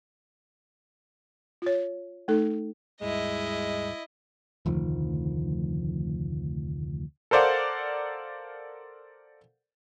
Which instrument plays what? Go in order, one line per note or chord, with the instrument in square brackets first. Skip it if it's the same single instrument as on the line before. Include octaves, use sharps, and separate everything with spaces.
[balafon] F4 C#5
A3 D#4 A4
[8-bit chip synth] D#2 G#2 G3 [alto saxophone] G#3 [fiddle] E4 D#5
[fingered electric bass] F1 D2 D#3 F3
[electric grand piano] A4 A#4 C5 D5 F5 F#5